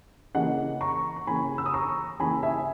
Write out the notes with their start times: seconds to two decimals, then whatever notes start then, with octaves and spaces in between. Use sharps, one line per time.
0.35 C#3 E3 A#3 D#5 F#5
0.81 A#5 C#6
1.16 C#6
1.27 C#3 E3 A#3 G#5 B5
1.58 E6
1.66 D#6
1.74 A#5 C#6
2.20 C#3 E3 A#3 G#5 B5
2.43 E5 G#5